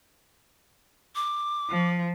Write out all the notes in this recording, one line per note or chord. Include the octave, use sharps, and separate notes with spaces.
D6
F3